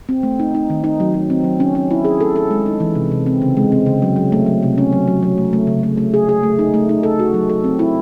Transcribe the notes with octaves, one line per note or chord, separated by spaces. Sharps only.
C4
A3
D#4
D#4
D#3
D#4
F#3
F#3
C4
F#3
C#4
C#4
E4
G#4
A4
A4
G#3
D#4
E3
C3
C3
C4
C#3
G#3
C4
C#3
F#3
F#3
A3
F#3
C3
C#4
F#3
F#3
F#3
A3
A3
C#3
A3
A3
G#4
G#4
A3
D#4
A3
D#4
A4
F#4
F#3
A4
C4
E4